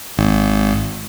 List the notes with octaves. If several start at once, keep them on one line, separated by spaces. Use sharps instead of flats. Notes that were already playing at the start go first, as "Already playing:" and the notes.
G#1